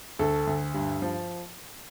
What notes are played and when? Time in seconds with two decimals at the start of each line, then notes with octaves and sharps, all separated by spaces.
0.19 D2 A4
0.47 D2
0.74 G2
1.02 F3